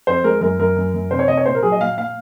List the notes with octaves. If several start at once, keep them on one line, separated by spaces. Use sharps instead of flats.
F2 C5
G#3 A#4
F#2 A#4
F#2 A#4
F#2
F#2
C3 C5
C#5
C3 D#5
C#5
A#2 C5
A#4
F#3 G#4
D#5
A#2 F5
A#2 F5